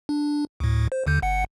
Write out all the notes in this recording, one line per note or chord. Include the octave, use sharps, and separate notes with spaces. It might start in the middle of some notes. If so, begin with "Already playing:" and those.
D4
D2 A2
C5
D#2 D3 G6
G1 F#5 C#7